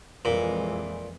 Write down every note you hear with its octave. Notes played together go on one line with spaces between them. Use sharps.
F2 A#2 E3 G#3